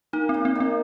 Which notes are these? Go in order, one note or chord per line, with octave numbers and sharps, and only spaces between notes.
A#3 D#4
C#3 C4
C4
D#3 C4